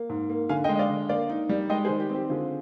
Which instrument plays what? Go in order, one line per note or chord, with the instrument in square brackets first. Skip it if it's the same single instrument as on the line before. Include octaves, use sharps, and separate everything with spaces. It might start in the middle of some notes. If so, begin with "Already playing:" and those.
Already playing: [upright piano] A#3
G#2
A#3
D3 F5 G#5
D#5 G5
G#3
D#5
D5 F5
D3
A#3 D5 F5
D#4
G3
G#3 D#5 G5
G#4 C5
D#3
G4
C4
G4
D3 F4 G#4